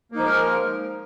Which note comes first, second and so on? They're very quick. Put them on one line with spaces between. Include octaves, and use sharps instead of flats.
A#3 D#4 F3 G#3 A#4